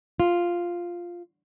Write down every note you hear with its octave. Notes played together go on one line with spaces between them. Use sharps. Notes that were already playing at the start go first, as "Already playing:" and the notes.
F4